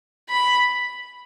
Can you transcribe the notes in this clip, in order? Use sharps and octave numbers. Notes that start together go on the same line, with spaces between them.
B5